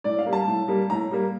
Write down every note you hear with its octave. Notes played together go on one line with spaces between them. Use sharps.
A2 D5
F5
G3 A#3
A5
A2
G3 A#3
A2 A#5
G3 A#3